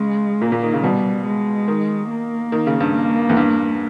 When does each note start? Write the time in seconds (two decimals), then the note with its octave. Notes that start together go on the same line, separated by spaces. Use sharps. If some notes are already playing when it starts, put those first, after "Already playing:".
Already playing: C#3 G#3
0.41 A#2 A#3
0.52 A#2
0.63 D#3
0.73 C#3
0.84 B2 G3
1.26 G#3
1.68 D#3
2.10 A#3
2.52 D#3
2.67 C#3
2.80 G2
2.95 A#3
3.29 E2
3.37 G2